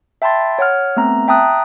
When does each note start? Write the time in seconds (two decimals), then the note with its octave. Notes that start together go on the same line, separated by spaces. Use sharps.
0.22 E5 G5 A5 B5 C6 A6
0.59 C#5 F#5 F6
0.96 A3 B3 C4 A#5
1.28 E5 G5 A5 A#5 D#6 F#6